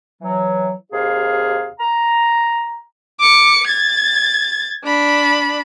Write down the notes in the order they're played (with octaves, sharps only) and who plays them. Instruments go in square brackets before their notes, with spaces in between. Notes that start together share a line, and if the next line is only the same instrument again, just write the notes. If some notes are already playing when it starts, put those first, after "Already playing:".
[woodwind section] E3 F#3
D#2 C3 G#4 F5
A#5
[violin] D6 C#7
G#6 A6
D4 B5